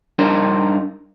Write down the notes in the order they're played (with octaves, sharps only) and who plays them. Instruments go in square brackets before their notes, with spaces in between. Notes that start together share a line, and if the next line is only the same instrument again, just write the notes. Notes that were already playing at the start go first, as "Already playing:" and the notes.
[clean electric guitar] G2 D4 D#4 A#4 C5